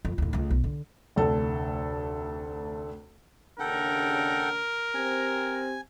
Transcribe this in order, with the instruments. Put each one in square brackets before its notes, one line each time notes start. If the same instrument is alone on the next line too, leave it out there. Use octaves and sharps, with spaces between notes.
[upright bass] F2
D#2 A2
C#2 A3
B1
D3
[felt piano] F1 D2 A4
[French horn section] D#2 C#3 D4 [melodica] A4 F#5 G5 [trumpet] A#4
[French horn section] C4 G4 [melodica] G#5